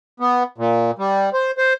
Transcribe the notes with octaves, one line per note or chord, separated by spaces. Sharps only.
B3
A#2
G3
C5
C5